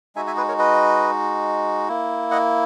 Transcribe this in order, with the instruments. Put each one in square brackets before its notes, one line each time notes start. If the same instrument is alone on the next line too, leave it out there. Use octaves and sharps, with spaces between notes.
[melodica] G#3 D#4 F#4 E5 G#5
E5 G#5
G#4 B4
A#4 C#5
B4 D#5
A#3 E4
D#5 F#5